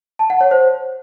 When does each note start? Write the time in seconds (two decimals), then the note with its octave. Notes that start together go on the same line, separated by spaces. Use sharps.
0.19 A5
0.30 F#5
0.41 C#5
0.51 C5